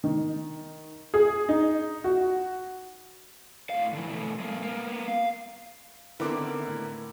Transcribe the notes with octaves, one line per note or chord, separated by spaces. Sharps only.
D#3
G#4
D#4
F#4
A2 F5
D3 E3
B2 A3
G#3 A#3
A#3 B3
F5
D3 D#3 B3 C4 E4 A#4 D6
A2